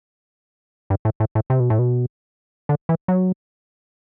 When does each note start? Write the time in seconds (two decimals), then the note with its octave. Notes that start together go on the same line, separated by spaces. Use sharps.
0.90 G2
1.05 A2
1.20 A2
1.35 A2
1.50 C3
1.60 B2
1.70 A2
1.79 B2
2.69 D3
2.89 E3
3.08 F#3